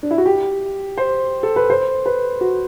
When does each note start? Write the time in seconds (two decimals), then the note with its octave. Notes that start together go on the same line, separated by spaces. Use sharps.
0.03 D4
0.11 E4
0.18 F#4
0.26 G4
0.98 C5
1.43 A4
1.56 B4
1.70 C5
2.06 B4
2.41 F#4